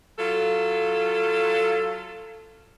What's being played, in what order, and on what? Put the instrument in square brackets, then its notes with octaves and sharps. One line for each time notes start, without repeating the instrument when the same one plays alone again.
[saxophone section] F#3 F4 A4